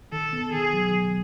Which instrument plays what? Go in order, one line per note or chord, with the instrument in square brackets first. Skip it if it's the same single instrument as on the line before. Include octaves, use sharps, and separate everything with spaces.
[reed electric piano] D#3 [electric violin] A4
[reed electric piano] B3
[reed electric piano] D#3 [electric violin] G#4
[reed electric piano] F#3